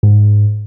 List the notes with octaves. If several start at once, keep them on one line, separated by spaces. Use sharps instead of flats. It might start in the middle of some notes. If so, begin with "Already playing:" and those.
G#2